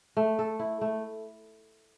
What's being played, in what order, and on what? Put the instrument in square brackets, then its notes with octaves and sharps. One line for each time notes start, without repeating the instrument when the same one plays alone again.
[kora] A3
A4
E4
A3